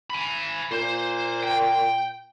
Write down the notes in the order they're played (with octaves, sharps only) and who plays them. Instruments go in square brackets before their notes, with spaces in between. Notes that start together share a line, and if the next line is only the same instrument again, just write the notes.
[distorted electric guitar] G#5 B5
[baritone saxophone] A#2 [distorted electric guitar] C5
[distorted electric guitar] G5